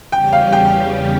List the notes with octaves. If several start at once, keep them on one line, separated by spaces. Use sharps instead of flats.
E2 C#3 G3 C#4 G4 G5
F5
G5